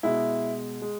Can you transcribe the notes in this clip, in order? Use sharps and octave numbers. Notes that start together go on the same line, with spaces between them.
B2 G#3 E4
G#3